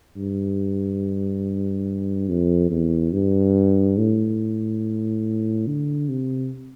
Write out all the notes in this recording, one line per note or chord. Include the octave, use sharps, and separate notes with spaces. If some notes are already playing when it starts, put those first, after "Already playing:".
G2
F2
E2
G2
A2
D3
C3